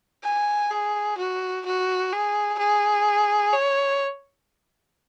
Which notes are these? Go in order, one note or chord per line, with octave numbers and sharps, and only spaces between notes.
G#5
G#4
F#4
F#4
G#4
G#4
C#5